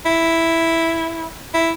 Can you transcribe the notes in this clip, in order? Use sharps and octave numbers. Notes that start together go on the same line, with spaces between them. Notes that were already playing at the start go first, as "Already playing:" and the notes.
E4
E4